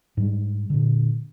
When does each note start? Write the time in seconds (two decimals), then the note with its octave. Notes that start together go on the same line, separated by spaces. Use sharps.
0.17 G#2 G3
0.70 A#2 D3